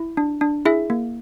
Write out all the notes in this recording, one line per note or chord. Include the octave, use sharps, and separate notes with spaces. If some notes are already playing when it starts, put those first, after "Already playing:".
Already playing: E4
D4
D4
E4 G#4 E5
A#3